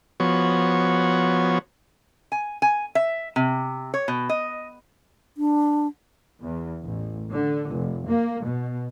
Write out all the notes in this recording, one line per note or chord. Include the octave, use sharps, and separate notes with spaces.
F3 B3 F#4 C#5
G#5
G#5
E5
C3
C#5
B2
D#5
D4
E2
A1
D3
F1
A#3
B2